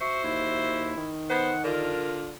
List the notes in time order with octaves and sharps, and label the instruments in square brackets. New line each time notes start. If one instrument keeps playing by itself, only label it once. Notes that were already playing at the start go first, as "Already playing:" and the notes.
[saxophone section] F#4 C5 E5 [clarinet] C#6
[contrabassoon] D#2 [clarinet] E4
[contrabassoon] D#3
[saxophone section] B3 C5 [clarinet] F#5
[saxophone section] D3 D4 F4 [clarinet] A#4